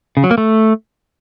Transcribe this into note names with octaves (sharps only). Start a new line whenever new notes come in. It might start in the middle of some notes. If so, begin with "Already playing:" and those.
C#3
F#3
A#3
A3